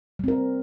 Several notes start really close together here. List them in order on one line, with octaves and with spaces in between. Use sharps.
G3 C4 A#4